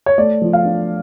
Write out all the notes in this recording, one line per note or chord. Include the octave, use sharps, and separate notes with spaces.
C#5
A3 D5
F3
F5
D4